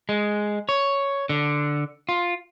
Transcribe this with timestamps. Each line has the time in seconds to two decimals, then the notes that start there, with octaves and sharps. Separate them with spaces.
0.09 G#3
0.69 C#5
1.29 D3
2.09 F4